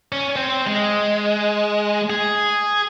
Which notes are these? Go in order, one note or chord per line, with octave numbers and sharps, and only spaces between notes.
C#4
C4 C5
G#3
G#4